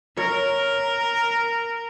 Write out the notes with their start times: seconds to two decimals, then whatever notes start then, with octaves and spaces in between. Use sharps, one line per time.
0.17 A#4 C#5